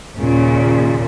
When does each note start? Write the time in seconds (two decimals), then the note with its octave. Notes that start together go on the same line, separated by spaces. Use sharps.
0.17 D#2 A#2 C#3